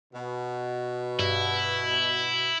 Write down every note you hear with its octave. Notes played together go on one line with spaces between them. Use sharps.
B2
G2 E4